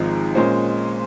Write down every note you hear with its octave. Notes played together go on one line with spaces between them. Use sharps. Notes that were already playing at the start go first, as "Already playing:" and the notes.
Already playing: G#1 G#2 F3 G#3
A#2 G#3 C#4 C5